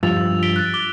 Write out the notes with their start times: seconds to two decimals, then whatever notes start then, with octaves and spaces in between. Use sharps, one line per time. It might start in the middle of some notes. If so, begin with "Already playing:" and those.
0.03 G2 F3 E6 A6 F7
0.43 B6 D7 G7
0.56 F#6 A6
0.74 D6 G7